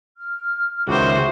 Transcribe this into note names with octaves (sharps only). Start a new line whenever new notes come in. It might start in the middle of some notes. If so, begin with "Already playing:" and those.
F6
C#2 D#3 F#4 C5 E5 D6